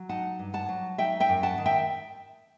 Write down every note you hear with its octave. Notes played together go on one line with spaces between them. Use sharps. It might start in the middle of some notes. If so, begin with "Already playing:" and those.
Already playing: F#3
D#4 F#5 A5
G2
F#5 A5
F#3
D#4 E5 G5
E5 G5
F#2
F#5 A5
D#3
E5 G5